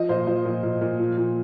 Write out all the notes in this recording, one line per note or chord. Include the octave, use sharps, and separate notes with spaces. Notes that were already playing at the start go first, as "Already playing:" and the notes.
Already playing: F3 D#5
A#2 C5
F3 C5
A#2
A#2
A#2
F3
A#2